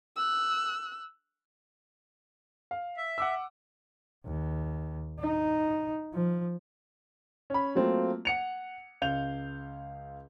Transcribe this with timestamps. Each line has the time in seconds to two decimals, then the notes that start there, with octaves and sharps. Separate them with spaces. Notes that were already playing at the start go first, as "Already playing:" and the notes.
0.17 E6 F#6
2.71 F5
2.97 E5
3.18 F#5 D6 E6
4.26 D#2
5.20 D#4
6.13 F3
7.50 C#4 B5
7.75 F#3 A3 A#3 C4 F4
8.25 F#5 C#7 F7
9.01 C#2 F5 G6 F7